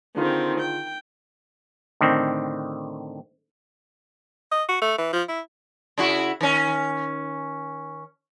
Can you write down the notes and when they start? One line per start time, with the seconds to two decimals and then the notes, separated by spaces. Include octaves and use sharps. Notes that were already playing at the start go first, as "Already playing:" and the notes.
0.16 D3 D#3 C4 F4 G#4
0.60 G5
2.01 A2 D3 D#3 C4
4.52 D#5
4.69 F#4
4.82 A3
4.98 E3
5.13 F3
5.29 E4
5.98 C#3 E4 F#4
6.41 D#3 C#4